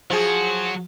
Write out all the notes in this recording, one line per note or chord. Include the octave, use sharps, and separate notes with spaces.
F3 F#3 F#4 G#4